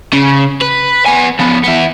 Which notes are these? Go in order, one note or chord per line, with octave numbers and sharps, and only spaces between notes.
C#3
B4
B3 G#5
F3 B3
B3 E4